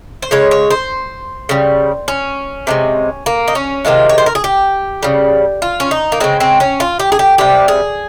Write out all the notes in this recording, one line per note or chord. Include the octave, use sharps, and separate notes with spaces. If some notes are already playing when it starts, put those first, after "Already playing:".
C5
C#3 G#3 C#5
C#5
C5
C#3 G3
C#4
C3 D#3 G#3
A#3
D#4
C#4
C3 D#3 G#3 F4
C#5
C5
A#4
G#4
G4
C#3 G3
F4
C#4
D#4
A#3
C#3 G#3 C4
C4
C#4
F4
G4
G#4
G4
C3 G3 G4
G#4